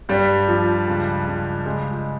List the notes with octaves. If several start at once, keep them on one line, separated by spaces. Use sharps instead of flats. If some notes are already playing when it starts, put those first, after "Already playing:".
G2 G3
F3
C#2
C#2
C#2 G#3